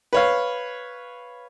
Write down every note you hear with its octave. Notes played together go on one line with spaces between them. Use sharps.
B4 C#5 F5